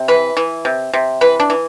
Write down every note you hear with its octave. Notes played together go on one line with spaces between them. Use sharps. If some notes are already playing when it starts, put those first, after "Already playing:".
Already playing: C3
E3 B4
E3
C3
C3
E3 B4
D4
E3